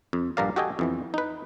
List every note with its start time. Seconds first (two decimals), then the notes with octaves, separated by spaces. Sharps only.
0.13 F2
0.37 A#1 G2 A#3 A#4 D5 F5
0.56 F#4 G4 A4 D#5 G5 G#5
0.79 F2 E3 B3
1.14 D#4 B4